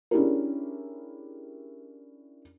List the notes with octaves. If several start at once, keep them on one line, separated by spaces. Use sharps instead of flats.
C#4 D4 E4 G4 G#4 A#4